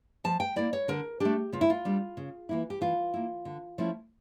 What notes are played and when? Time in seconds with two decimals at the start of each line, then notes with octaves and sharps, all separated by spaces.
0.24 F3 A5
0.40 G5
0.56 A#3 E4 D5
0.73 C#5
0.88 D3 A#4
1.20 A3 D4 G4
1.53 C#3 F4
1.61 E4
1.70 F4
1.85 G3 D4
2.17 C#3
2.49 E3 A#3 E4
2.70 G4
2.81 E3 F4
3.14 A#3 E4
3.45 D3
3.78 F3 A3 C#4 E4